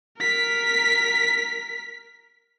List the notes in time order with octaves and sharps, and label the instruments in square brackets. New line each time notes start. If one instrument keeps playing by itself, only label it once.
[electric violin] A#4 B6